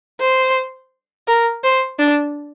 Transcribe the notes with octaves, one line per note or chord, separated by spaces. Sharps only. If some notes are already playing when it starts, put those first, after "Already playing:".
C5
A#4
C5
D4